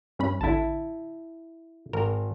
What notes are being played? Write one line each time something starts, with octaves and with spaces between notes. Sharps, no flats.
G2 C#4 B5
A1 D3 E4 A5
G#1 A#4